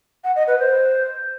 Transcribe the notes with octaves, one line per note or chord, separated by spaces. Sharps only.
F#5
D#5
B4
C5